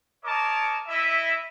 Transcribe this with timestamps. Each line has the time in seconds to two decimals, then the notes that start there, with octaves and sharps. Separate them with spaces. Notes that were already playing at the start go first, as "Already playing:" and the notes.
0.25 A#4 C#5 D#5 A5 D6
0.87 E4 D#5 E5